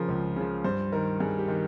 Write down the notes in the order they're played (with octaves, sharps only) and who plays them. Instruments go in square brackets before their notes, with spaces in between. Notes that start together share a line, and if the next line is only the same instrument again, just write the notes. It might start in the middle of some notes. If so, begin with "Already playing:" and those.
Already playing: [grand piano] C#3 F3 A#4
C#2
C#3 F3
G2 C5
D#3 A#4
G2 G#4
G4
D#3